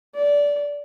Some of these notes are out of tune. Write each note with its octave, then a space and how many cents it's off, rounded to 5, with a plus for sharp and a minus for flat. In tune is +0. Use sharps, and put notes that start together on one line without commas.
D5 -15